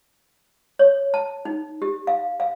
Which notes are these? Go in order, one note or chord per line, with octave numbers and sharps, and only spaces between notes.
C#5
A5
D#4
G4
F5
F5